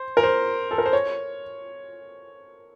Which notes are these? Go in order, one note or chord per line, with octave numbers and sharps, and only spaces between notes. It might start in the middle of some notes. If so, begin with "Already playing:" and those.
Already playing: C5
A#4
C5
A4
A#4
C5
C#5